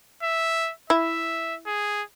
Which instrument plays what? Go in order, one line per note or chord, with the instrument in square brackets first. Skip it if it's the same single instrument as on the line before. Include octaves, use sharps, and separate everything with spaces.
[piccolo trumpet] E5
[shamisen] E4 [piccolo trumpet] E5
[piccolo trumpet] G#4